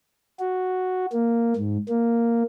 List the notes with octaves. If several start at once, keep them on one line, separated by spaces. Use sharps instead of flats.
F#4
A#3
G#2
A#3